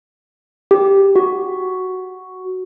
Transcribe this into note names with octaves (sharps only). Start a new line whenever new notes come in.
G4
F#4